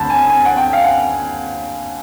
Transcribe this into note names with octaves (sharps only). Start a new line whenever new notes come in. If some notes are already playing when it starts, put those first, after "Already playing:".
Already playing: D2 A5 B5
G#5
G#5
F#5
G5
F5
F#5